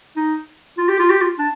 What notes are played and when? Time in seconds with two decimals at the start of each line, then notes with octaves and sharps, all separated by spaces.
0.16 D#4
0.78 F4
0.89 G4
0.99 F4
1.10 G4
1.21 F4
1.39 D4